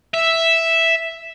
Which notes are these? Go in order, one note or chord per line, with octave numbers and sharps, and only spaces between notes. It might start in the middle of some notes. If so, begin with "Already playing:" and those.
E5